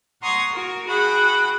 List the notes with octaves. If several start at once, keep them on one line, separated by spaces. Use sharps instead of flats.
F#5 A#5 C6 C#6 D#6 G#6
F#4 A#4
F#4 G#4 F#5 G5 B5